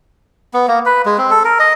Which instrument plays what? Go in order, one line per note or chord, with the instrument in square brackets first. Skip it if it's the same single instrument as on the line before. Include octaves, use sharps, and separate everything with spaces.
[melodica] B3
A#3
B4
G#3
C4
A4
A#4
D#5